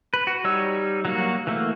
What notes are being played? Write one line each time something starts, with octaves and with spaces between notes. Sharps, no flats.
B4
F#4
G3 D#4 C#5 E6
F#3 A#3 F#4
E3 A3 A#3